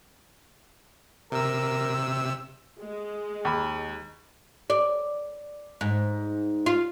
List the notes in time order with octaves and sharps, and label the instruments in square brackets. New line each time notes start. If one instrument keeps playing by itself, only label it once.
[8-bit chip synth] C3 E6 [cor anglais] A#4
[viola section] G#3
[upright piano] D#2 B5
[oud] D5
G#2
F4